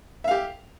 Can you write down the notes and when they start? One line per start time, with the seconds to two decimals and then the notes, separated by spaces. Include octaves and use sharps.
0.24 E5
0.28 F5
0.31 G4